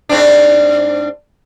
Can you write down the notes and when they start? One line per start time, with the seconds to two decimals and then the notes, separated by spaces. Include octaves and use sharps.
0.09 G#2 C4 D4